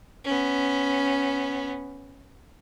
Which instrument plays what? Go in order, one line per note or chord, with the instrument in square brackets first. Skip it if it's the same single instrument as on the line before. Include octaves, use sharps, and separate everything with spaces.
[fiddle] B3 C#4